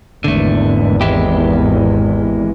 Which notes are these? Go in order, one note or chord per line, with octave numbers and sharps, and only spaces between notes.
G#1 E2 D3 A3
G#3 E4 G4